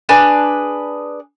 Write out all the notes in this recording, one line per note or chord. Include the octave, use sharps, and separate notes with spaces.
D4 G#4 B4